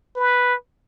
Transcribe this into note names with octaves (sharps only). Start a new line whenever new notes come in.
B4